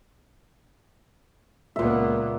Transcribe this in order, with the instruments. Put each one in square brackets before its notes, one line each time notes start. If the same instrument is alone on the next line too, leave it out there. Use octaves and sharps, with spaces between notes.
[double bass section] C#2 A#3 B3 [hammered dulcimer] A#2 E5